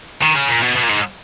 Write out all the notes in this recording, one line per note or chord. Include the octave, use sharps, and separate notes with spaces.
D#3
C#3
A#2
B2
B2
A#2
G#2